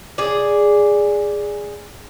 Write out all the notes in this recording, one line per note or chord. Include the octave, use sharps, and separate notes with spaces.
G#4 D5